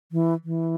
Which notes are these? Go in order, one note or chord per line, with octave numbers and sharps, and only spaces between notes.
E3
E3